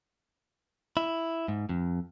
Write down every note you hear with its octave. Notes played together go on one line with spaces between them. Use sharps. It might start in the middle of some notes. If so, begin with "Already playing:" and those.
E4
G#2
F2